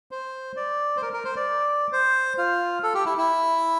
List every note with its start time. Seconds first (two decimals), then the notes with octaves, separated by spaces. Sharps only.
0.11 C5
0.57 D5
0.97 C5
1.02 A#4
1.13 A#4
1.25 C5
1.36 D5
1.92 C5
2.38 F4
2.83 A4
2.94 G4
3.06 E4
3.18 E4